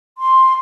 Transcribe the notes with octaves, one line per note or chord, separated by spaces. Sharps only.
C6